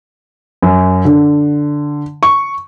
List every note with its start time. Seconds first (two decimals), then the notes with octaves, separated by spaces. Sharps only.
0.62 F#2
1.05 D3
2.23 C#6